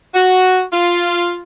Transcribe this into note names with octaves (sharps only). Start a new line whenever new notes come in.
F#4
F4